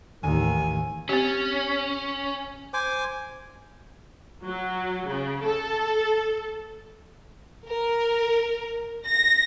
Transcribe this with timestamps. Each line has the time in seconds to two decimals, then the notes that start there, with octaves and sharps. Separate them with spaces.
0.23 A1 D#2 D#3 G#5
1.09 C4 C#4 G4
2.73 C5 G#5 D6
4.44 F#3
5.08 C#3
5.46 A4
7.67 A#4
9.06 A#6